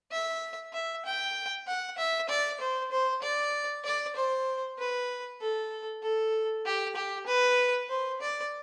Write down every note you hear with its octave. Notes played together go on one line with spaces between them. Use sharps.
E5
E5
G5
F#5
E5
D5
C5
C5
D5
D5
C5
B4
A4
A4
G4
G4
B4
C5
D5